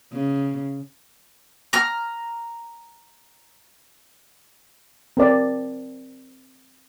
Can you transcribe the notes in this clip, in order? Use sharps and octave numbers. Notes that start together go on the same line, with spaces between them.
C#3
A#5 F6
C4 A#4 D5